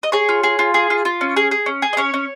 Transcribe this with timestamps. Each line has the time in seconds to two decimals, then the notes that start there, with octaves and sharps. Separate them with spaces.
0.03 D#5
0.12 G#4 C#5
0.29 F4
0.43 G#4
0.59 F4
0.74 G#4
0.90 F4
1.05 F4
1.21 C#4
1.36 G#4
1.51 G#4
1.66 C#4
1.82 G#4
1.93 D#5
1.97 C#4 C#5
2.14 C#4